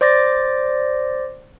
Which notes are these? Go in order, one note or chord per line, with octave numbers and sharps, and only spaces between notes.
C5 D5 D6 A6 A#6